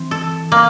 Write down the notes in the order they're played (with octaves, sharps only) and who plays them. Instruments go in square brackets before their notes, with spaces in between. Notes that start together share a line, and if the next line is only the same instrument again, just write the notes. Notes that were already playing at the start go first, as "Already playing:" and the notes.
Already playing: [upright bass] E3 [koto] C4
[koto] A4
A#3